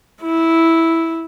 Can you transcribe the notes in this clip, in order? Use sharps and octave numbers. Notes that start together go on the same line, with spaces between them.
E4